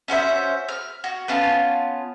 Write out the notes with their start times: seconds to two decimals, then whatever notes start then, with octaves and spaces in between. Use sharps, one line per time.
0.08 C#4 F#4 C5 E5
0.69 F6
1.04 F#4
1.28 B3 C#4 F4 A5